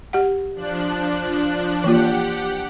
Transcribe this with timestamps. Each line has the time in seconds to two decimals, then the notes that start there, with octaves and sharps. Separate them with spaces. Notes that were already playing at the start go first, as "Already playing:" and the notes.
0.13 G4 F#5
0.55 F3 D4 F#6
1.84 E3 A#3 F4 G4 F#5